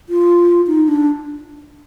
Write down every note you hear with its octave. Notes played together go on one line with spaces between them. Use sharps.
F4
D#4
D4